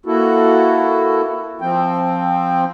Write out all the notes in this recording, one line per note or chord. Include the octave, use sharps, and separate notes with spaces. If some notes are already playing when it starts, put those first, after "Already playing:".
A#3 E4 F#4 A4
F3 C4 G5